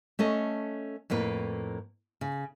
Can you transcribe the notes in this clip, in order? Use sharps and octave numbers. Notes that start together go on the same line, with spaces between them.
A3 C#4 A4 D#5
F2 A2 A#3 B4
C#3